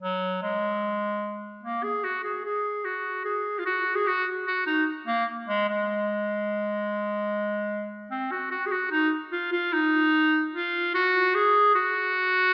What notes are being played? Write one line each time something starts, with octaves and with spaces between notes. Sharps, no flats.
F#3
G#3
A#3
G#4
F#4
G#4
G#4
F#4
G#4
F4
F#4
G#4
F#4
F#4
D#4
A#3
G#3
G#3
C4
F#4
F#4
G#4
F#4
D#4
F4
F4
D#4
F4
F#4
G#4
F#4